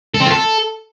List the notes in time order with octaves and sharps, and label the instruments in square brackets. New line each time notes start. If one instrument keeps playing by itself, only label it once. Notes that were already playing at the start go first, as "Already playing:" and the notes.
[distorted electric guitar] A4
C4
F4
A4